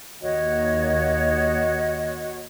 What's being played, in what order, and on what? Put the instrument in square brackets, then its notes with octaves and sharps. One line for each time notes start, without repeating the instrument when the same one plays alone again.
[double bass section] D#2 [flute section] F#4 C#5 D#5